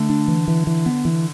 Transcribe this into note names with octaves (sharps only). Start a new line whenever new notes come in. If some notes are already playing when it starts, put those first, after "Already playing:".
Already playing: D3 A3
D4
E3
E3
E3
B3
E3